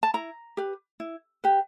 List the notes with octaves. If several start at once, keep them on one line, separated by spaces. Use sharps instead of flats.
A5
E4 A#5
G4 B4
E4
G4 B4